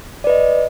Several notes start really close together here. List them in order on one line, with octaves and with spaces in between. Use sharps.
D5 B4 D#5